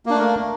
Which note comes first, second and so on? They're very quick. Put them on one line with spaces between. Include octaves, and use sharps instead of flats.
A#3 D4 A3 A#4